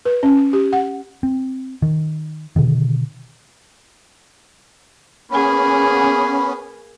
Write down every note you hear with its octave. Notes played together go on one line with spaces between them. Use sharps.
B4
C#4
G4
F#5
C4
D#3
B2 D3 D#3
A#3 B3 C#4 G#4 B5